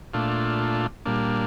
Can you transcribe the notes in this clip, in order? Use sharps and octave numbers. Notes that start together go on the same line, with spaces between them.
A#2 A3 D4 F4
A#2 G3 A#3 D4